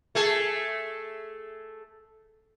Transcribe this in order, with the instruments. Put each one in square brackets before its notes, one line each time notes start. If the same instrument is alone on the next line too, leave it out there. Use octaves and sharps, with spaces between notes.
[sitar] A3 G#4 A4